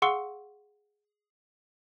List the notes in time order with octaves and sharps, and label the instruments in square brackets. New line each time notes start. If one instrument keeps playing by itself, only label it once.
[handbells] G#4 F5 F#5 C6 C#6 E6